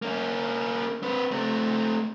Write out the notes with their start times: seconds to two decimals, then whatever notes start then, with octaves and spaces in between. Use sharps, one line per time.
0.02 A#3 C#4
1.03 C4 B4
1.31 A3 C4